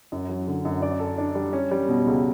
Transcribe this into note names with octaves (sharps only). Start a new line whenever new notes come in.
F#2
F#3
D3
F#2
D5
A4
D4
G3
C#4
G3
B2
C#2